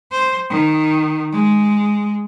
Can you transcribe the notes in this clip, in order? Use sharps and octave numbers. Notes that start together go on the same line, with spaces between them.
C5
D#3
G#3